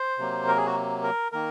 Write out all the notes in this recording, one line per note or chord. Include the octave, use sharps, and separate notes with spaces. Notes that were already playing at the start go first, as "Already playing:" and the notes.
Already playing: C5
C3 F#3 A#3
A#4
G#4
F#4
A#4
D#3 A#3 A#4